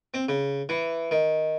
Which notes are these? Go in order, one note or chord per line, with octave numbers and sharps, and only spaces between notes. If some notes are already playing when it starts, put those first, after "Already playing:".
C4
C#3
E3
D#3